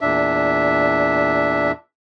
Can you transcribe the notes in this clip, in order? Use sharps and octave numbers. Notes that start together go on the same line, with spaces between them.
E2 A#2 D4 E5